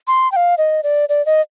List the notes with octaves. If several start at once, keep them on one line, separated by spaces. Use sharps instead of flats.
C6
G5
F5
D#5
D5
D5
D#5